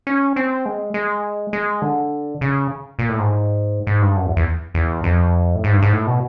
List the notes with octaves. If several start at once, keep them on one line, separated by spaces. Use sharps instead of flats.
C#4
C4
G#3
G#3
G#3
D3
C#3
A#2
A2
G#2
G#2
G2
F#2
E2
E2
E2
F2
A2
G#2
G2
G#2
A2
B2